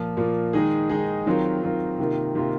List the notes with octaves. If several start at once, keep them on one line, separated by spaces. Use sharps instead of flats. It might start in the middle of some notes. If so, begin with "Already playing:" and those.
Already playing: A#2 F3 A#3
A#2 F3 A#3
D#3 G#3 D#4 G#4
D#3 G#3 D#4 G#4
D#3 F#3 C4 F4 A#4
D#3 F#3 C4 F4 A#4
C3 D#3 A#3 F4 A#4
C3 D#3 A#3 F4 A#4